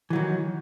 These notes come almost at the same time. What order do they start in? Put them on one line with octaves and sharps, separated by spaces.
E3 F#3 D#3